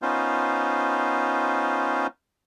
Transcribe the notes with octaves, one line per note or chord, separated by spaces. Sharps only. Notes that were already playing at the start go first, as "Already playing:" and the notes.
B3 C#4 D#4 F4 C5